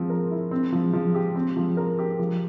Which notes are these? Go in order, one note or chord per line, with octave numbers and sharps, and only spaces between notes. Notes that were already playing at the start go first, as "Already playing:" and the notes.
Already playing: F3 C4
A#4
E4
C4
F3
F3
G4
C4
F3
A#4
G4
F3